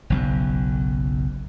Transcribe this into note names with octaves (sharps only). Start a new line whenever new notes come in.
F#1 B1 F#2